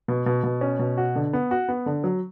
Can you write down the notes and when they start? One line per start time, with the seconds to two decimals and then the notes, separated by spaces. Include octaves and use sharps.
0.08 B2
0.26 B2
0.44 B2
0.61 C#4
0.79 B2
0.97 F#4
1.16 D3
1.33 B3
1.51 F#4
1.69 B3
1.86 D3
2.04 F#3